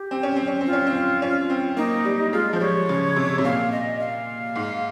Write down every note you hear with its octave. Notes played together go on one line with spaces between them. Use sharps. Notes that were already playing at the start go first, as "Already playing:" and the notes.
Already playing: G4
C4
C#4
C4
C#4
C4
F4
C#4
C4
C#4
C4
A#3 D#4
G3
G#3 F4
F3 C5
G3 C#5
C#3
C3
C3
A#2 F5
D#5
F5
G#2